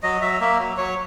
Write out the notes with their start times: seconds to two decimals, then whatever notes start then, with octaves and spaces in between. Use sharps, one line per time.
0.03 F#3 D#5
0.22 F#3 E5
0.41 A#3 E5
0.59 F#3
0.77 F#3 C#5